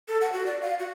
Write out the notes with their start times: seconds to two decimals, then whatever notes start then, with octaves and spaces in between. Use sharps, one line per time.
0.08 A4
0.21 F#5
0.33 F#4
0.46 D5
0.62 F5
0.79 F#4